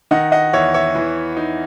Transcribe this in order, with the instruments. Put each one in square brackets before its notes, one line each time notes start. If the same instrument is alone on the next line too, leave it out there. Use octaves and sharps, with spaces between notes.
[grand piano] D#3 D#5 F#5
D#5 F#5
E2 C#5 E5
C#5 E5
E3
D#4